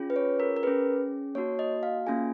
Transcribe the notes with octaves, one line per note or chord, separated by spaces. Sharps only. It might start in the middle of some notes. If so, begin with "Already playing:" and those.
Already playing: C#4 F4 G#4
B4
C#5
A#4
A#4
C#4 G#4 B4
A#3 D#4 F#4 C#5
D#5
F5
A#3 C#4 F4 G#4 G#5